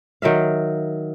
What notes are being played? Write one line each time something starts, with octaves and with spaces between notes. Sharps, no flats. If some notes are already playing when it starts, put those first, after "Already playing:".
D#3 F#3 E5 F5